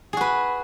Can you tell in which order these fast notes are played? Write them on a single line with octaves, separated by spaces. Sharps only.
G#4 F#4 B4